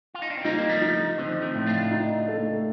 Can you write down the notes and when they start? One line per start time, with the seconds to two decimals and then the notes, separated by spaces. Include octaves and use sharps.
0.14 F4
0.22 D#4
0.30 D4
0.37 C4
0.44 G3 A#3 D#4
0.59 A#3
0.69 F3 A3
0.82 D#4
1.18 D3 F3 C4
1.42 F3 A3
1.55 A2
1.67 D4 F4
1.91 D#4
2.28 A3